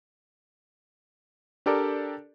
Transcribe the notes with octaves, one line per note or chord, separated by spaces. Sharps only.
D4 G4 A4 A#4 D5